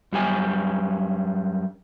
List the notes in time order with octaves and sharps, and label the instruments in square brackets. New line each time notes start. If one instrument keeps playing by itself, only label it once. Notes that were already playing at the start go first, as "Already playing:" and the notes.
[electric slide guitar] F#2 G3 F#4 G#5